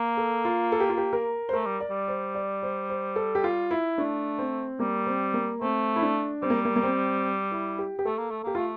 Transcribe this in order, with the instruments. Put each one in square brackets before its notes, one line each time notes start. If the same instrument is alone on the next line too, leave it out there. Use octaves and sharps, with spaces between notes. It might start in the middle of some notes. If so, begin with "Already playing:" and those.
Already playing: [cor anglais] A#3
[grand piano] A4
F4
A4
G4
F4
G4
A#4
C5
[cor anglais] A3 [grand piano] A#4
[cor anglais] G3
[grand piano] D5
[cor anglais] G3
[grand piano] C5
D5
C5
C5
A4
G4
F4
E4
[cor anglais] A3 [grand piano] D4
[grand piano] C4
[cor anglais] G3 [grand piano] A#3
[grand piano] C4
A#3
[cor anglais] A3 [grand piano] C4
[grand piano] E4
D4
[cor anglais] G3 [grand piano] C4
[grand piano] A#3
A#3
A#3
C4
E4
G4
G4
[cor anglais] A3 [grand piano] A4
[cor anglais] A#3
A3
[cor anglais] A#3 [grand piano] G4
[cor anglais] A3 [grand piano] F4